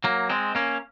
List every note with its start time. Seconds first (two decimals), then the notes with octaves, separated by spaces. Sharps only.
0.04 F#3 A#3
0.30 G#3 C4
0.55 A#3 C#4